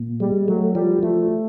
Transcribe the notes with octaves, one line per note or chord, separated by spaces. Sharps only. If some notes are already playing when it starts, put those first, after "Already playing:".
Already playing: A#2
G3 G#3
F#3 A3
F3 G3
F3 A3